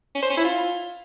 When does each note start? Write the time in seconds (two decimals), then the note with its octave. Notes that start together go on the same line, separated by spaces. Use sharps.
0.15 C#4
0.23 C5
0.30 C#4
0.37 E4
0.45 F4